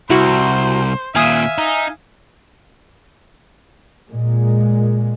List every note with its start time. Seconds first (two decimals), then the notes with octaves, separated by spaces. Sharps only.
0.10 C2 E4 F#4 C5
1.15 D#2 A#2 E5 F5 G#5 D#6
1.58 D#4
4.09 A#2 G#3